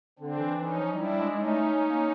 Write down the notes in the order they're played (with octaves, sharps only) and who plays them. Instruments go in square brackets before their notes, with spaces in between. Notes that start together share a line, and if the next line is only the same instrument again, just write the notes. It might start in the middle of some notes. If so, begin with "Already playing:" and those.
[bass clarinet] D3 [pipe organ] C4 D4
[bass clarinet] E3
[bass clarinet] E3 [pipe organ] C#4 D#4
[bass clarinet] F3
[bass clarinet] G3 [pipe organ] D4 E4
[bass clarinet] G#3
[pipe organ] C#4 D#4
[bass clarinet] A3
A#3